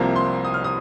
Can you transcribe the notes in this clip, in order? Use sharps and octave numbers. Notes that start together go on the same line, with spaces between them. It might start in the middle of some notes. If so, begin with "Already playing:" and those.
Already playing: C2 C3 F3 A#3 A#5
C6
D#6
F6
D#6